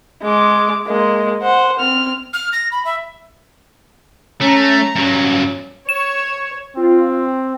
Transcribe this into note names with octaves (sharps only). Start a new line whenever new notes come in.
G#3 D6
G#3 A#3
C5 F#5
C4 F6
F6
A#6
B5
E5
A3 C#4 A#5
G2 F#3 C#4
C#5 E7
C4 F4